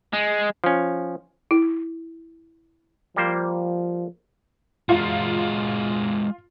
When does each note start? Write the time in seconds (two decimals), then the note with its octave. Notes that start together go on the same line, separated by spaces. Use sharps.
0.13 G#3
0.64 F3 C#4
1.51 E4
3.16 F3 G3 A#3 C5
4.89 G#3 F4 F#4